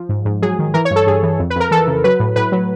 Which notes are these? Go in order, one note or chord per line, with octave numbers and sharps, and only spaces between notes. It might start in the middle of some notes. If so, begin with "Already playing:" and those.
Already playing: F3
G#2
G#2
F#3 G#4
D#3
E3 A#4
C#5
G2
A4
G2 G#4
E3
F2
B4
F2 A#4
E3 A4
C#3
F#3 B4
A2
A2 B4
F#3